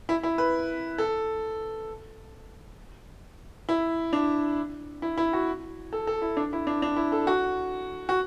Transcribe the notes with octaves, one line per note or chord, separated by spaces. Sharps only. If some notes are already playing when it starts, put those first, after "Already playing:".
E4
E4
B4
A4
E4
D4
E4
E4
F#4
A4
A4
E4
D4
E4
D4
D4
E4
A4
F#4
F#4